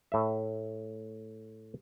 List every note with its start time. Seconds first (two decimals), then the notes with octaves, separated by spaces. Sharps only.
0.12 A2 E5